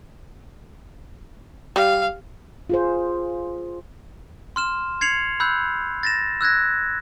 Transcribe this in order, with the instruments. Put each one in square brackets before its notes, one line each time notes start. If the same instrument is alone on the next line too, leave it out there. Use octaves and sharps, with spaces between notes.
[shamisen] G3 [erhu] F5
[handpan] F4 G#4 C5
[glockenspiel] C6 F6 E7
G#6 C7 C#7 F7 F#7
B5 E6 F#6 G6
A6 A#6 E7
E6 F#6 G#6 A#6